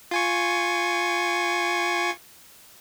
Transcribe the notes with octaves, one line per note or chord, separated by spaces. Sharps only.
F4 G#5 C#6